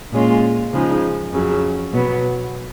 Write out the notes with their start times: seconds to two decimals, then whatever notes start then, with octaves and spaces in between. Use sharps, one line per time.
0.12 A#2 G#3 C#4 F4
0.73 C#3 F3 G#3 D#4
1.33 F2 C#3 F#3
1.93 B2 F#3 B3